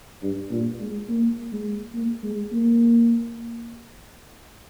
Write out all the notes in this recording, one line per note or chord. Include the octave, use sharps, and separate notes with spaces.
G2
A#2
G#3
A#3
G#3
A#3
G#3
A#3